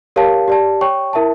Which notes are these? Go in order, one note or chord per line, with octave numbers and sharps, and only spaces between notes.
G4 A#4 C#5 F5 A5
G4 D5 A5
C#5 G5 C#6
E4 A#4 E5 A5